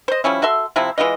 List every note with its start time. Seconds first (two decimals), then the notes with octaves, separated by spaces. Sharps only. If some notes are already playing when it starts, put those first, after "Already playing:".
0.08 C5 D#5
0.24 F3 G3 C#4 E4
0.42 F#4 A4 E5 C6
0.76 C3 F3 C4 E4
0.98 E3 G#3 F4 D#5